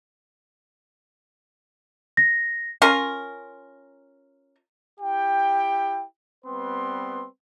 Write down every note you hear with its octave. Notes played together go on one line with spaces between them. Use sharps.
A#6
C#4 F4 A#4
E4 G4 G5
G3 B3 C4 B4 C6